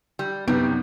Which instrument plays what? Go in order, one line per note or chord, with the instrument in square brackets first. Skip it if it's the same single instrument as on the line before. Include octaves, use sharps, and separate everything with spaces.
[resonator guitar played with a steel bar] G3
[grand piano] F#2 C3 [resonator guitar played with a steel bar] G3 [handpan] B3 [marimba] D#4